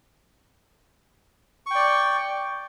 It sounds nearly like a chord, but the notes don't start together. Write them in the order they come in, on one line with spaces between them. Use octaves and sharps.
C#6 G5 D5